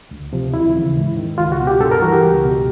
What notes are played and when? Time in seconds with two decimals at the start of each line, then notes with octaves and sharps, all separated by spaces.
0.11 D2
0.33 C3 F3
0.54 D#2 E4
0.75 C#3 E3
0.97 G#2
1.17 D#3
1.38 C#2 F4
1.52 F#4
1.60 B2
1.67 G4
1.80 G2 A4
1.92 A#4
2.02 E3 F#4
2.12 G4
2.23 C#2
2.44 B2